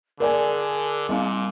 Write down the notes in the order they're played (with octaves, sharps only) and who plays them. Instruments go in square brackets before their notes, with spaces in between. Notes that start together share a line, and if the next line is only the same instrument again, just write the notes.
[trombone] D3 [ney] G#4 [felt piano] A#4 D5 G#5
[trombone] A#2 [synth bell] G3 C4 F5